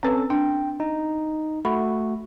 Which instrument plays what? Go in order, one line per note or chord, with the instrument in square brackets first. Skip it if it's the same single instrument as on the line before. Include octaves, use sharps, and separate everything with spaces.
[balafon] C4 B4 [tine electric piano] C#4 A4
[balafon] D4 [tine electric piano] G5
[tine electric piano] D#4
[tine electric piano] A3 F#4 [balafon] B5